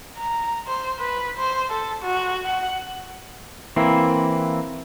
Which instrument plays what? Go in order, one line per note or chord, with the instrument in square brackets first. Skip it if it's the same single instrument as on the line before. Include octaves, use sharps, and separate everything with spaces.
[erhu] A#5
C5
B4
C5
A4
F#4
F#5
[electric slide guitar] E3 A#3 C4 E4